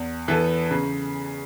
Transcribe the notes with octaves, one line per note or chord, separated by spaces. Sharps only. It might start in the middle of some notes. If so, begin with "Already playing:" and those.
Already playing: E2
E3 B3 A4
C#3